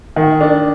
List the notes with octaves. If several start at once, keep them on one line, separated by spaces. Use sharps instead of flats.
D#3
D4